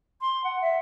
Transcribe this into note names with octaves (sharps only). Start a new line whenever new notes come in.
C6
F#5
E5